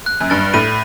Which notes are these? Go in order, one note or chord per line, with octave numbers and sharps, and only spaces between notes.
F#6
F#2
G2 A6
A2 D#7